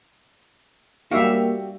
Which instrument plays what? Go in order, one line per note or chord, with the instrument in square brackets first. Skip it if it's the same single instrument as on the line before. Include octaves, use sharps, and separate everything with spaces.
[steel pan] G3 E5 F5 [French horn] A#3 [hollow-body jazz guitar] F#4 G4